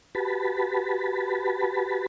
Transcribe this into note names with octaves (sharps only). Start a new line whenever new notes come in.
F#4 G4 B4 A5 B5